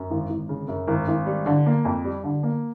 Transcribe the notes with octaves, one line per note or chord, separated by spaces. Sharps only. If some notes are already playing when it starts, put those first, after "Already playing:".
Already playing: F#2
G#1
G#1
C#3
F#2
G#1
G#1
G3
D3
A#3
F2
G3
D3
A#3